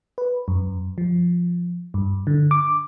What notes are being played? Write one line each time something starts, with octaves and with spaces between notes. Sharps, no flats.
B4
F#2
F3
G2
D3
D6